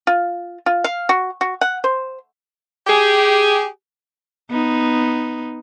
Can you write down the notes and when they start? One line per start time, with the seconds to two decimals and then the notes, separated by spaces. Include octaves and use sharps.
0.07 F4
0.66 F4
0.84 F5
1.09 F#4
1.41 F#4
1.61 F#5
1.84 C5
2.86 G4 G#4
4.50 B3 D#4